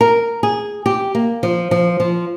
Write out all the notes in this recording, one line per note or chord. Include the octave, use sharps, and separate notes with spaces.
A#4
G#4
G4
A#3
F3
F3
F3